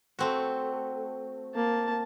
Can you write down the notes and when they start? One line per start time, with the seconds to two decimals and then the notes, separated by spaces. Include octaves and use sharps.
0.19 A3 C4 F#4
1.55 A#3 A5